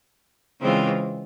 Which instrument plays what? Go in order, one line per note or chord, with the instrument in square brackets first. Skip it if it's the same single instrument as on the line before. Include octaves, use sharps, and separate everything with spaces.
[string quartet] C#3 E3 G#3 C4 F4